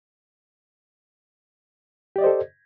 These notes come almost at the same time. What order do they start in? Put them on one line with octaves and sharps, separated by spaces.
G4 D5 D#5 C5 A4